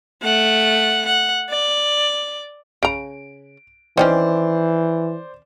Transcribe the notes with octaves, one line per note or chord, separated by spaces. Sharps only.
A3 F#5
F#5
D5
C#3 A#5 D7
D#3 E3 C4 C#4 C5 D5